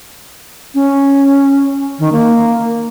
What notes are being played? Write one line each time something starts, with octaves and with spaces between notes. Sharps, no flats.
C#4
D#3
A#3